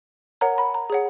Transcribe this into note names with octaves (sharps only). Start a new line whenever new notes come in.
A#4 C#5 F#5 A#5
B5
A#5
G#4 C#5 F#5